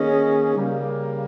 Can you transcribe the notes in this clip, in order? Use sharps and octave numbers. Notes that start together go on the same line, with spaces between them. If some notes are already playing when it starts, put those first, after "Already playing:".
Already playing: D#3 A#3 C#4 G#4 D#5
C#3 G3 A#3